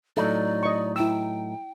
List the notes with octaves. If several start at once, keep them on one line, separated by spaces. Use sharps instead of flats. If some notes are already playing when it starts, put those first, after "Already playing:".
A2 F#3 D#4 A4 D5
D#5 C#6
E4 G5 E6